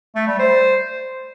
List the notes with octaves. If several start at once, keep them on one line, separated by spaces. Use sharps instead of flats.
A3
G3
C5